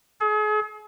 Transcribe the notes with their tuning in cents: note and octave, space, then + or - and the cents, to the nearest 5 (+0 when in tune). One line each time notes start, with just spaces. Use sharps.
G#4 +40